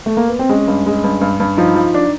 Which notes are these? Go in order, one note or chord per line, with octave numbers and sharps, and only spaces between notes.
A3
A#3
B3
C4
G#3 C#4
G2
G#3
G2
G2
G2
F3 D#4
F3
D4